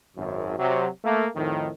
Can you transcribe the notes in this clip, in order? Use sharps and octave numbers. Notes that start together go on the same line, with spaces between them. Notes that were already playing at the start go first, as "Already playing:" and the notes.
G#1 F#2
C3 F#3
A3 A#3
F2 A2 D#3